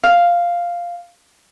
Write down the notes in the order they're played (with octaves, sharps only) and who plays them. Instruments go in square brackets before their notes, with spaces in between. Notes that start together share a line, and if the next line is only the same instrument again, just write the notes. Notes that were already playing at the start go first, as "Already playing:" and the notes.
[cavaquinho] F5